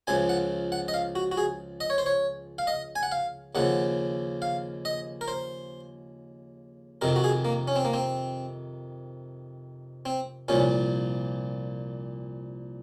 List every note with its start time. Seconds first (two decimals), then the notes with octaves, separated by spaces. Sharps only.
0.07 C#2 C#3 F3 G#5
0.29 F#5
0.72 F#5
0.88 D#5
0.94 F5
1.15 F#4
1.32 F#4
1.37 G#4
1.81 D#5
1.90 C#5
1.98 C5
2.06 C#5
2.58 F5
2.67 D#5
2.96 G#5
3.03 F#5
3.12 F5
3.55 D#2 C#3 F3 F#5
4.42 F5
4.85 D#5
5.21 A#4
5.28 C5
7.01 F2 C3 D#3 A#4
7.16 F#4
7.24 G#4
7.45 A#3
7.68 C#4
7.76 C4
7.85 A#3
7.93 C4
10.05 C4
10.48 C2 A#2 F3 C#4